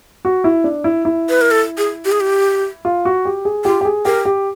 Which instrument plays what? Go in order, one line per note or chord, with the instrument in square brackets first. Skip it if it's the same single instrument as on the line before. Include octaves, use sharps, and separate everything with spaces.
[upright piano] F#4
E4
D4
E4
E4
[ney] B4
A#4
A4
G#4
G4
G#4
G4
[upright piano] F4
F#4
G4
G#4
[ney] F4 [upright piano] G4
[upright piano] G4
G#4
[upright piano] G4 [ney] A#4
[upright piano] G4